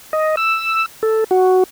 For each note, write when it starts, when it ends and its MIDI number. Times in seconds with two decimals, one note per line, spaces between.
0.13 0.36 75
0.37 0.86 88
1.03 1.24 69
1.31 1.63 66